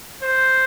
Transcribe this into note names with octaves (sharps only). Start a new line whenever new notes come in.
C5